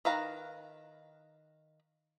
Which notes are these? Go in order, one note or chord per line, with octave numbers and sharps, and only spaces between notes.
D#3 B4 F5 A#5